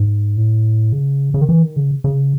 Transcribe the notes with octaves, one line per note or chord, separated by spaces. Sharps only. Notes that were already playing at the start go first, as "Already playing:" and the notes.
Already playing: G#2
A2
C#3
C#3
D#3
E3
D#3
C#3
C#3